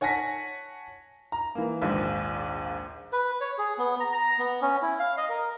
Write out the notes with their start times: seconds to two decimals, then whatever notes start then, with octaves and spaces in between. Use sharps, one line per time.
0.01 C#5 F#5 G#5 A5 A#6 B6
1.32 A#5
1.55 E3 A#3
1.82 A#1 D#2 G#2
3.13 B4
3.41 C#5
3.58 G#4
3.78 B3
4.00 A#5
4.14 A#5
4.39 B3
4.62 C#4
4.82 E4
4.99 F5
5.17 D#5
5.29 A#4